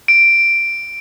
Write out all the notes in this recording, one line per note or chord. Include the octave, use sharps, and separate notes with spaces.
D7